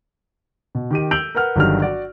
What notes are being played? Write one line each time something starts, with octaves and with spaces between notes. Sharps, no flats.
B2
D#3 G4 D#7
E6 G6 D7 F7 F#7
A#4 B4 F#5 F6
G1 D#3 F#3 G3 D4 F6
F#4 D5